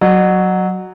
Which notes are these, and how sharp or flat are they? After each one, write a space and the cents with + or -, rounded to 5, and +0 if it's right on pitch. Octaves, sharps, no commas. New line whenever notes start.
F#3 +0 D#5 -45